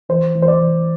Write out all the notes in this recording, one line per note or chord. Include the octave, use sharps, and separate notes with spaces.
E3 C5
E3
C5
D5
E3